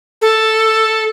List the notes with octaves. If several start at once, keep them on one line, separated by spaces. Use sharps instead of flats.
A4